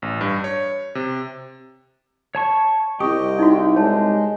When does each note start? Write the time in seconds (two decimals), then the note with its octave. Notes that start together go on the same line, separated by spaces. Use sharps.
0.02 A1
0.21 G2
0.44 C#5
0.95 C3
2.35 C#5 A5 C#6
3.00 C2 G4 D#5 G5 C#6 D#6
3.39 D#4 E4 F#4
3.76 G#3 C#5 A5